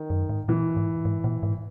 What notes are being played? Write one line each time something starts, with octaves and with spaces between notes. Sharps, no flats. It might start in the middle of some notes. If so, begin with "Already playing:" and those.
Already playing: D#3
F#2
G#2
A#2 E3
G#2
G#2
A#2
G#2